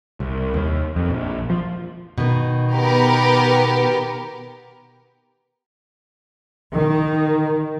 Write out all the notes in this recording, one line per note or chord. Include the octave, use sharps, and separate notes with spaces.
C2
D#2
F2
A#1
F3
B2 D#3
B3 G4 A#4
D#3